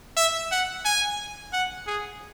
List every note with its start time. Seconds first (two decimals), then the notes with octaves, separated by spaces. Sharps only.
0.17 E5
0.52 F#5
0.85 G#5
1.53 F#5
1.87 G#4